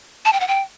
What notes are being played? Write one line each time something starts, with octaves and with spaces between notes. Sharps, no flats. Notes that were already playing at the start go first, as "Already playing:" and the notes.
A5
G5
F#5
G5